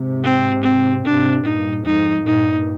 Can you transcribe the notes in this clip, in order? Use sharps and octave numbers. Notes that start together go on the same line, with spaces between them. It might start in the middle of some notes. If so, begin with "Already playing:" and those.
Already playing: G#2 C3
C4
C4
G#2 C3 D4
G2 A#2 D#4
F2 G#2 D#4
G2 A#2 D#4